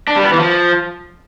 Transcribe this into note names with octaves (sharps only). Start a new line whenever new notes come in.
D4
G3
B3
E3
F3